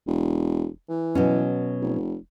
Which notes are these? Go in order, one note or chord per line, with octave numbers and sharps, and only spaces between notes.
E1
E3
B2 F#3 C#4
F1